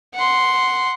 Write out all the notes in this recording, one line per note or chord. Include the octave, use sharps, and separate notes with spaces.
F#5 C6